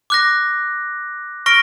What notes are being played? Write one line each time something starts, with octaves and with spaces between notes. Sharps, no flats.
D6 F#6 A#6
C#6 F6 A#6 D7